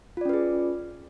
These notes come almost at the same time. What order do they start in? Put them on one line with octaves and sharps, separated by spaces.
F4 D5 C#4 B4 G#4